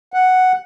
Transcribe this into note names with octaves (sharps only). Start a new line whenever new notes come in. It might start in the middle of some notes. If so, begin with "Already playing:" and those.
F#5